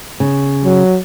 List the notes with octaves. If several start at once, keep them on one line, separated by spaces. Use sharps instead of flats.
C#3
F#3